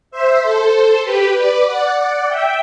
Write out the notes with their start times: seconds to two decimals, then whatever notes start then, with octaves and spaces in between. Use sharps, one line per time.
0.11 C5 E5
0.42 A4 C5
1.03 G4 B4
1.34 B4 D5
1.66 D5 F#5
1.96 D5 F#5
2.28 E5 G5